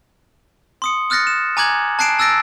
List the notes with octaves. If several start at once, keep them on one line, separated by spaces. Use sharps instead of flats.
C6 D#6 C#7
D#6 F6 F#6 A6 A#6 C#7
E7
G#5 A#5 D6 F#6 G#6 F#7
A5 F#6 C7 D7 E7
A5 E6 F#6 A6 A#6 D7